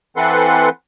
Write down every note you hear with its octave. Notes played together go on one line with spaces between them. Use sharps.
E3 C4 A4 B4 F#5 C6